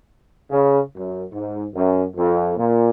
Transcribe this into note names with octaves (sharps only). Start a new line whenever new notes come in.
C#3
F#2
G#2
F#2
F2
A#2